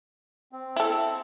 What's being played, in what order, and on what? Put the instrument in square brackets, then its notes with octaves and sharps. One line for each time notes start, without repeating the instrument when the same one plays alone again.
[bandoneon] C4
[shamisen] E4 A4